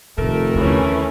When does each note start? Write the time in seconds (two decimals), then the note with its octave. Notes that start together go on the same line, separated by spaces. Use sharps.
0.18 F1 A2 D#3 A3 A#4
0.55 D#2 D3 E3 C#4